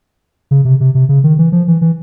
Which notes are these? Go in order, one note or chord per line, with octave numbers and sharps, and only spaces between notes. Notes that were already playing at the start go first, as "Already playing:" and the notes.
C#3
C3
C3
C3
C#3
D#3
E3
F3
E3
E3